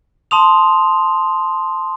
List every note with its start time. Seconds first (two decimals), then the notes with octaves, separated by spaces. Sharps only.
0.31 A5 C6 D#6 F7